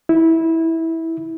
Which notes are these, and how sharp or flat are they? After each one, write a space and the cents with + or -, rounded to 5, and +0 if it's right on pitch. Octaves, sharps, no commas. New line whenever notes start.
E4 -15